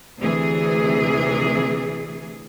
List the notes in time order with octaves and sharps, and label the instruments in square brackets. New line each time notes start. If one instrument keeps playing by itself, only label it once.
[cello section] D2 C3 E3 G#4